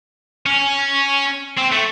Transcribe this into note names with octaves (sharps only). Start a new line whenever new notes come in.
C#4
C4
A3